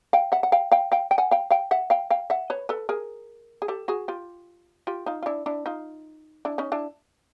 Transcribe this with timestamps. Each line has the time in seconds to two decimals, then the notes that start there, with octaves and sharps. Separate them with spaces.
0.13 F5 G5
0.32 E5 F#5
0.43 F#5
0.52 F5 G5
0.72 F5 G5
0.92 F5 G5
1.11 G5
1.18 F#5 G#5
1.31 F5 G5
1.51 F5 G5
1.71 E5 F#5
1.90 F5 G5
2.10 F5 G5
2.30 E5 F#5
2.50 B4 C#5
2.69 A4 B4
2.89 G#4 A#4
3.62 G#4
3.68 G4 A4
3.88 F#4 G#4
4.08 F4 G4
4.87 F4 G4
5.06 D#4 F4
5.23 F4
5.26 D4 E4
5.46 D4 E4
5.66 D#4 F4
6.45 D4 E4
6.58 C#4 D#4
6.72 D4 E4